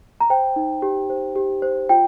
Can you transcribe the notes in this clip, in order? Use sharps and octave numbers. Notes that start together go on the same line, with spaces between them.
A#5
C5 G5
D#4
G4
C5
G4
C5
F4 G5